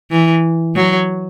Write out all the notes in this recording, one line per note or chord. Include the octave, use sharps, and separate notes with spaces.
E3
F#3